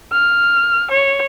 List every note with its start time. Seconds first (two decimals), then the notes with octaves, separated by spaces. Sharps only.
0.12 F6
0.91 C#5